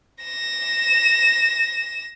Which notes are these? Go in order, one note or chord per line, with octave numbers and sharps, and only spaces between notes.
A#6 E7